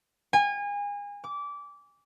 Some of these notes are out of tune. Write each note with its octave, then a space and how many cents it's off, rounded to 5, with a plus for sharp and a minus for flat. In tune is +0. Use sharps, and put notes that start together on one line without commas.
G#5 -30
D6 -20